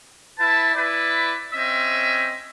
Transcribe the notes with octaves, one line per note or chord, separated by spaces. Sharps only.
E4 B4 A5
E4 B4 D5
C4 C#4 D#5 E5